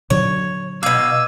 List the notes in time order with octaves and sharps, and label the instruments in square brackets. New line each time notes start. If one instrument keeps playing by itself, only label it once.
[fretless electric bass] A#2 D3 F#3 [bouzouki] C#5
[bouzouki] B2 F5 [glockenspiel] D6 G#6 D#7 [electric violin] E6